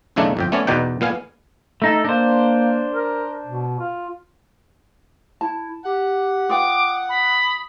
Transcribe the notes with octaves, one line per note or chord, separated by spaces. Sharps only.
B1 E2 C#3 A3 D4 D#4
G1 F2 G5
A3 B3 C#4 C#5 D5
E2 B2 D#4 D5 F#5 G5
A#2 B3 F5 G#5
A3 D#4 A4
A#3 D4 C5
A#4
B2
F4
E4 A5
G4 F#5
F4 B4 G5 D6 D#6
B5